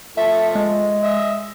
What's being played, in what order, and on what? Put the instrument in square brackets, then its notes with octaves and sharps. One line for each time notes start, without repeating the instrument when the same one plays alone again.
[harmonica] F3 A3 [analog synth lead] E5
[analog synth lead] G#3
[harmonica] D#5 E5